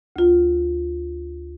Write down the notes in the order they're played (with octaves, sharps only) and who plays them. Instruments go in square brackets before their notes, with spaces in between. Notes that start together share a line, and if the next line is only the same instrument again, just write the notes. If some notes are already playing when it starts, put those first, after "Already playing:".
[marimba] D2 F4